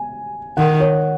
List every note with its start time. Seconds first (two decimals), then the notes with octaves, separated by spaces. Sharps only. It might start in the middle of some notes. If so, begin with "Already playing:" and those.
Already playing: G#5
0.57 D#3 F#5
0.80 C#5